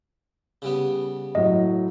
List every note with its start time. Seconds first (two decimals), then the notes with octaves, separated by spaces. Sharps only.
0.62 C#3 G3 B3
1.35 A2 F#3 D#5